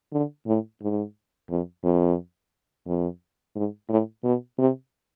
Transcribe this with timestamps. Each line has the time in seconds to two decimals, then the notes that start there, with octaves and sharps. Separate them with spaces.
0.12 D3
0.47 A2
0.82 G#2
1.50 F2
1.84 F2
2.86 F2
3.55 G#2
3.89 A2
4.24 B2
4.58 C3